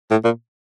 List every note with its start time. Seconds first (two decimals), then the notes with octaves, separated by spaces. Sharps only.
0.11 A2
0.24 A#2